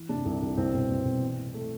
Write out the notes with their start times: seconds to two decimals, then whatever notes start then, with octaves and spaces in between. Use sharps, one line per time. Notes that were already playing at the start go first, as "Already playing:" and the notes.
Already playing: E3
0.09 C3 D4
0.25 C2
0.42 C2
0.57 C2 C4
0.74 B2
0.90 B2
1.05 C2
1.21 E3
1.38 A2
1.54 A3